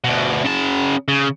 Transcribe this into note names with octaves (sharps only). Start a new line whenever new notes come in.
D2 B2
C#3 A5
C#3